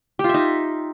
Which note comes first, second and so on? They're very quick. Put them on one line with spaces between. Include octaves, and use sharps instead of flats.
G4 F4 E5 D#4